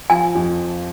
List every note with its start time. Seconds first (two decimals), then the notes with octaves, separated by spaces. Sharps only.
0.10 F3 G#5
0.35 F2